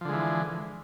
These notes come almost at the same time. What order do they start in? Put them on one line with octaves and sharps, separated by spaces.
F3 D3 G#3 E3